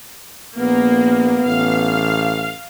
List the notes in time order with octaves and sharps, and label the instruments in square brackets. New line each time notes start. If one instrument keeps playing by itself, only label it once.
[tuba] A#1 [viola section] A#3 [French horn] B3
[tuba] A1 [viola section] F5